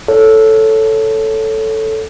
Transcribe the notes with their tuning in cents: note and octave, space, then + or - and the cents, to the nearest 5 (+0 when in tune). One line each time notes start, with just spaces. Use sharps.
A4 +0 C#5 +5